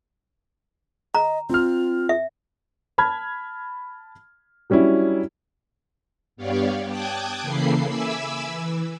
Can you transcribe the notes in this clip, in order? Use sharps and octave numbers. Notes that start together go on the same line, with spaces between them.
D#5 A#5
C4 F4 F6
E5
A5 B5 F6 G#6
F#3 G3 C#4 D4 E4
G2 B3 G4 C#5 D5 F5
G5 A5 D6 D#6 F#6 G#6
C#3 E3 A#3 A4 B5 C7
E5 G#5 B5 D6 E6
E3